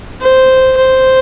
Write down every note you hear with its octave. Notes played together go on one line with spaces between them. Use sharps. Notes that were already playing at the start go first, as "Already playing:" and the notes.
C5
C5